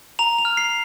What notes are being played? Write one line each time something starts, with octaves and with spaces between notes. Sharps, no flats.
A#5 F7
F7
F6
C7